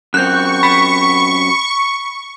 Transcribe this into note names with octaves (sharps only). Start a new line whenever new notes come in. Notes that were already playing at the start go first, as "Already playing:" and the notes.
F#2 C4 C#6 F#6 G6
B5 B6